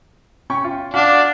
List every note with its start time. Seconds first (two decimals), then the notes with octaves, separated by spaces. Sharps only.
0.50 C#4 G5 C#6
0.64 F4
0.94 D4 F#4 F5 F#5